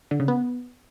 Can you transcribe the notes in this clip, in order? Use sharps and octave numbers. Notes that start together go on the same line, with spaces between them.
D3
C#3
B3